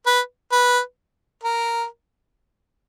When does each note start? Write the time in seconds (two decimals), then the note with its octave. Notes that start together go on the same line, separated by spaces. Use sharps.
0.06 B4
0.52 B4
1.43 A#4